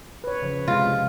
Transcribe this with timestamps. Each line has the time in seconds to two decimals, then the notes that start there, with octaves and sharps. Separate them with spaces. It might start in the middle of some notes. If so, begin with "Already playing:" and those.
0.24 B4 C#5
0.42 C#3 F3
0.68 C3 G#3 F4